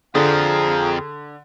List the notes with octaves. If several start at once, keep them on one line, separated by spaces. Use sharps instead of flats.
F2 D3 F3 G#4 F5 A#5